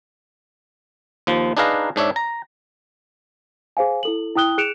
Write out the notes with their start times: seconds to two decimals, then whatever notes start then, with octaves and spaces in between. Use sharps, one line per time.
1.27 D#2 F3
1.57 D4 D#4 G#4 B4 F5 A#5
1.96 G#2 D4 C#5 E5
2.16 A#5
3.77 G#4 C5 F5 G#5
4.03 E4 A4 F#7
4.36 E4 G5 D#6 F#6 G7
4.58 G#4 F#6 C#7 D7 E7 F7